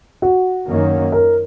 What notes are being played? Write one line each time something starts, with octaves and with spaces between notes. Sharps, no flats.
F#4
F#2 D#3 A#3 C#4
A#4